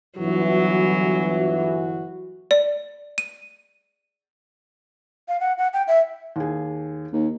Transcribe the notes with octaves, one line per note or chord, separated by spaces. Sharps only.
G1 E3 F#3 F#4
F#4
D5
D#7
F5
F#5
F#5
G5
E5
D#2 G#4
D#2